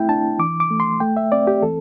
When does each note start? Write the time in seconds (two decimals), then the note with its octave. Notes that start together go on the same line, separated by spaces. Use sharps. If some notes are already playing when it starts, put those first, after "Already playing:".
Already playing: A3 C4 E4 G5
0.09 D4 A5
0.39 E3 D6
0.60 D6
0.71 A3
0.80 C6
1.00 A3 G5
1.17 E5
1.32 C4 D5
1.47 G4
1.62 E3 A4